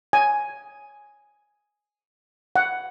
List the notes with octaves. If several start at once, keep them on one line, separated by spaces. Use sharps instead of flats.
G#5
F#5